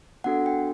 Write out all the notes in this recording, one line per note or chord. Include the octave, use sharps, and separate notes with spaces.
B3 D4 F#4 A4 F#5
G5